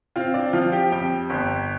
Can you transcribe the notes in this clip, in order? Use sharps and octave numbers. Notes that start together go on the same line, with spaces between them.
C4 F4 F5
D4 D5
F3 F4 F5
G4 G5
F2 G4 G5
G1